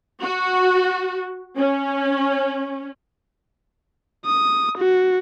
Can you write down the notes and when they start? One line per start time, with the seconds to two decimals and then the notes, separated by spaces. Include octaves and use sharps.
0.20 F#4
1.57 C#4
4.26 D#6
4.77 F#4